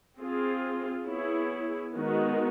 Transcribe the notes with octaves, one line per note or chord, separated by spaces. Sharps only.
C4 F4 G#4
B3 E4 G#4 C#5
D#3 G#3 B3 D#4 F#4